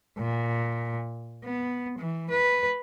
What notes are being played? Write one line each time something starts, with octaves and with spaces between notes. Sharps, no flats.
A#2
B3
E3
B4